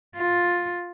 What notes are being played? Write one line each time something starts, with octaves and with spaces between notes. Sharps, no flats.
F4